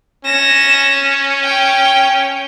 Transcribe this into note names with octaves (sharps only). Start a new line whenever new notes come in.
C#4 A#6 E7
G5